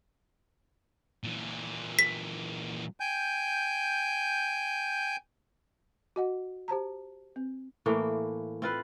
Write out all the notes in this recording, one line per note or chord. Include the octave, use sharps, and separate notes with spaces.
A#2 E3
B6
G5 G#5 G6
F#4 D#5 F#5
G4 C5 A5 A#5
C4
A2 E3 A3 A#3
C4 F4 B4